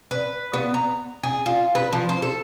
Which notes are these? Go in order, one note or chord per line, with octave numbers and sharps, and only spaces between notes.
B4
B3
A#5
G#4
F4
B4
F3
C5
A4